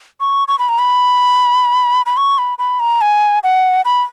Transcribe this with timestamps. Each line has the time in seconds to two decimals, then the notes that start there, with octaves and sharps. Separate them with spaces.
0.20 C#6
0.48 C#6
0.59 B5
0.69 A#5
0.79 B5
2.06 B5
2.17 C#6
2.38 B5
2.59 B5
2.80 A#5
3.01 G#5
3.44 F#5
3.85 B5